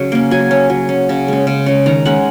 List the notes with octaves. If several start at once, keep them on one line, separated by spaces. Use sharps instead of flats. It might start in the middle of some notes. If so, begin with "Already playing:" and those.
Already playing: C#3 F#3
A#3 C#4
F#3 G#5
C#4
F#3
C#4
C#3
G#3 C#4
C#3
G#3 C#4
D#3 A#5
G#3 C#4 F#5